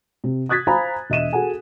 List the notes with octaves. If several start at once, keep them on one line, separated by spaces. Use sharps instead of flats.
C3
D#6 F#6 G#6 A6 B6
C5 F5 G#5 A#5 B5
E1 D#5 E5 D#7 E7
F#4 G#4 A4 F#5 G#5